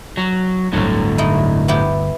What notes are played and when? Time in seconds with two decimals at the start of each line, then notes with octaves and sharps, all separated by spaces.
0.17 F#3
0.73 G1 D2 A2 D3 F#3
1.18 D#4 E4
1.68 B3 E4 G4